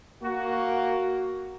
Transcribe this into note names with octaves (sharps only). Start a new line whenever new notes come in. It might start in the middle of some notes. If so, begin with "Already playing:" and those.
A#3 F#4